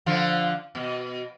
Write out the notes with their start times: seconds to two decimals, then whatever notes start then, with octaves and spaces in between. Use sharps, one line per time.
0.06 D3 F3 F4
0.75 B2